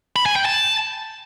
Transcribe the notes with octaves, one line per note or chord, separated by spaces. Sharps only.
B5
G#5
G5
A5